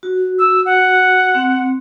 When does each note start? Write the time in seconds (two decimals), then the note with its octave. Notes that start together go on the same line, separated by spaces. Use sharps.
0.03 F#4
0.39 E6
0.66 F#5
1.35 C4